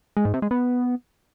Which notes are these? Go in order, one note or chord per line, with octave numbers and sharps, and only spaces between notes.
G#3
G#2
C3
G#3
B3